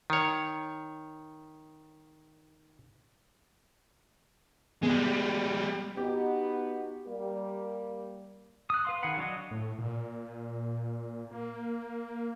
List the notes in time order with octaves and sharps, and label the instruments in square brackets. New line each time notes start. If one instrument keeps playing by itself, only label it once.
[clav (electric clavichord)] D#3 C#5
[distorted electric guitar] G3 G#3 [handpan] B3
[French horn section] B3 D#4 F#4 [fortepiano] G4
[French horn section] G3 A#3
[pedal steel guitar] D#6 F#6
B4 F5 C6
D#3 G#4 F5 F#5 B5
F#3 D4 C#5 D#5
[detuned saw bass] A2
A#2
A#3